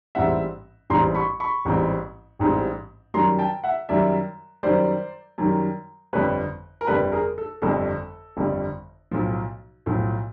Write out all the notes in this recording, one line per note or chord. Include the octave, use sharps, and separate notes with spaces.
A1 G#2 E3 G3 C4 E5 F#5
A1 G#2 E3 G3 C4 A#5 C6
B5 C#6
B5 C#6
A1 G#2 E3 G3 C4
A1 G#2 E3 G3 C4
F#2 D#3 G3 A#5 C6
G5 A5
E5 F#5
F#2 D#3 G3 D5 E5
F#2 D#3 G3 C5 D5
F#2 D#3 G3
G1 F2 D3 G3 B4 C#5
A#4
G1 F2 D3 G3 A4 B4
G#4 A#4
A4
G1 F2 D3 G3 A4
G1 F2 D3 G3
B1 A2 F3
B1 A2 F3